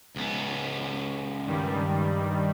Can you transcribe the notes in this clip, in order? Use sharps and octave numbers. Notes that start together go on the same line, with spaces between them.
C#2 B3
G2 D#3 G3